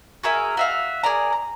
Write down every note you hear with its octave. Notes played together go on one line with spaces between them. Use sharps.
F#4 G#4 A#4 E5
F#4 E5 F5
G#4 A#4 D5 A#5
A#5